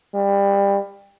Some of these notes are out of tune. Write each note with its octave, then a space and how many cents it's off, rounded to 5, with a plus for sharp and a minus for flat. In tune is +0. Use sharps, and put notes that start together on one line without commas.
G3 +25